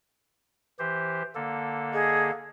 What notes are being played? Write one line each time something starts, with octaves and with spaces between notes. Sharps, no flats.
E3 G4 C5
D3 A#3 A4
G#4 D#5